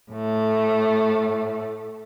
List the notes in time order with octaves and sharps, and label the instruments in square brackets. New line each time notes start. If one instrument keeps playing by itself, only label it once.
[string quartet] A2 A3